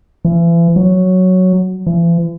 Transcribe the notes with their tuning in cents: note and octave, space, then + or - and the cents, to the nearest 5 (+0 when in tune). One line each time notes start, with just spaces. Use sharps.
E3 +40
F#3 +0
E3 +45